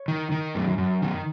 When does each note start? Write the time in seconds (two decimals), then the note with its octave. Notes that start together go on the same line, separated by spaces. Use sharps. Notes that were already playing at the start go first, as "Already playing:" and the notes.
Already playing: C#5
0.08 D#3
0.32 D#3
0.55 F#2
0.78 F#2
1.02 D#3